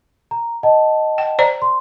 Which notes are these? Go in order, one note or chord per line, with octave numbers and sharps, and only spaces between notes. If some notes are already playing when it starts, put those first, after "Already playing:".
A#5
D#5 F#5 A5
G5
C5 D5 A#5
C6